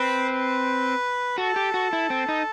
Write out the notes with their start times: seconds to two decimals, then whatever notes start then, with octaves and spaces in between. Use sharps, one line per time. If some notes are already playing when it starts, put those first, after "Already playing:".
Already playing: C4 B4
0.29 B4
1.38 F#4 A4
1.56 G4
1.74 F#4
1.93 E4
2.10 C4
2.29 D#4